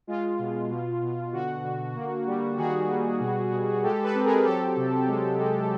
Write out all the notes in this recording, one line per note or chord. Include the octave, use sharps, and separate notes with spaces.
G#3 F4
B2
B2
B2
D3 F#4
D3
A#3
G3
D#3 F#4 G#4
G3
B2
B2
G#3 G4 A4
A4 B4
C4
G#4 A#4
F#3 G4 A4
C3
G#3
G#3